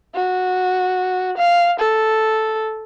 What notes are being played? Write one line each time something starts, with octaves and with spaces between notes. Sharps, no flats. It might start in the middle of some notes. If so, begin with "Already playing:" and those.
F#4
F5
A4